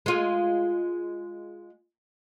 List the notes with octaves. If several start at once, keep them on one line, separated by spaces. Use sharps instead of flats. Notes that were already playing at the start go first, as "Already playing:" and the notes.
G#3 F4